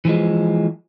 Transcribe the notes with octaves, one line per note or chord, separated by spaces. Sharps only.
E3 F3 G#3